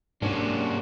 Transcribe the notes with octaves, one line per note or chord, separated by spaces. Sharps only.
G#2 C3 A#3 C#4 D4 F#4